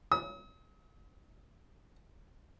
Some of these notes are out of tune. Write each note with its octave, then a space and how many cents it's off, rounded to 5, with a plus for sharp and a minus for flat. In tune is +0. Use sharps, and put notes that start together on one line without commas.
D#6 +45